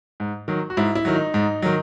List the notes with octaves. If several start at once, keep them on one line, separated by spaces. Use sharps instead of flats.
G#2
D#3 F#3
F#4
G#2 E4
E4
D#3 F#3
D#4
G#2
D#3 F#3